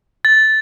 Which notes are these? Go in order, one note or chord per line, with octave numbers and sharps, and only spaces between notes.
A6